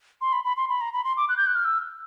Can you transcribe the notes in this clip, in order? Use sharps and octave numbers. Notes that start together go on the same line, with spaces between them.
C6
B5
B5
C6
B5
A#5
B5
C6
D6
F#6
G6
F#6
F6
E6